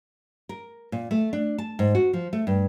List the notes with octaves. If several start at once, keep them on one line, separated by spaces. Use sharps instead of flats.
A#4
A#2
A3
D4
A5
G#2
F#4
F3
A3
G2